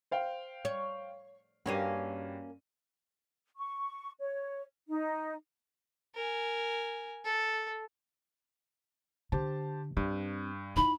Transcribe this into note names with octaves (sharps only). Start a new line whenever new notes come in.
C5 F5 G5
C#5
G2 A#3 C#4 F#4 G4 D#7
C#6
C#5
D#4
A#4 G#5
A4
D3 G4 C5 A5
G2 C4
D#4 E4 B5